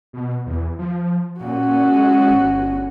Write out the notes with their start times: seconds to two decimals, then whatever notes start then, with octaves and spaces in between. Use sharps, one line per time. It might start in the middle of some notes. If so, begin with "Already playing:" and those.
0.13 B2
0.47 E2
0.79 F3
1.40 A#2 C#4 F#4
1.91 G#3
2.30 G1